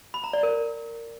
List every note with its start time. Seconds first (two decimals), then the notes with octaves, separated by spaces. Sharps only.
0.14 B5
0.24 A#5
0.33 D5
0.43 A#4